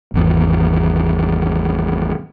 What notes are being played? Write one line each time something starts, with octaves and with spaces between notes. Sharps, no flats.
G#1 E2